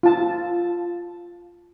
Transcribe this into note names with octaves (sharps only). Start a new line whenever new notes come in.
F4 A5